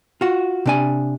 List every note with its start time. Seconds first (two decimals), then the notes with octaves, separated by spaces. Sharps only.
0.21 F4 F#4
0.66 C3 D4 G#5